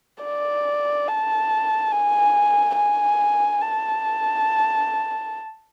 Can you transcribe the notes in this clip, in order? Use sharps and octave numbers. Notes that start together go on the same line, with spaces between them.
D5
A5
G#5
G#5
A5